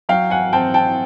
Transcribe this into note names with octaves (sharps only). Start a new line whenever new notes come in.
F#3 F5 G5
F#5 G#5
C4 G5 A5
G5 A5